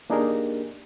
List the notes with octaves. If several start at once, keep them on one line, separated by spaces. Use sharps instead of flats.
A#3 D4 D#4 G4 G#4 A#4